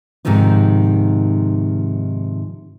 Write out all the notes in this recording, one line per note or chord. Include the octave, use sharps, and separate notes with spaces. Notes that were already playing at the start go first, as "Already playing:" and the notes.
G#2 C3 D#3 F3 D#4